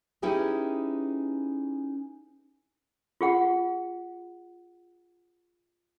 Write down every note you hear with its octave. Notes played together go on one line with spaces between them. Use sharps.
C#4 D#4 E4 G4 G#4 B4
F4 G#4 F#5